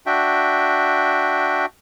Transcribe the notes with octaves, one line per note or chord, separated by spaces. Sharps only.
D4 F#4 E5 G5